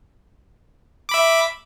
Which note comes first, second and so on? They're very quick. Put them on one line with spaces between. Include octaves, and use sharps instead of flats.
D6 B5 E5